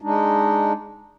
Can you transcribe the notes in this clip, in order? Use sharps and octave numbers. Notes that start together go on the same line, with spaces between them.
G#3 D4 D#4